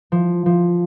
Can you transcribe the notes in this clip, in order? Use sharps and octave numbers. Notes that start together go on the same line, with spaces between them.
F3
F3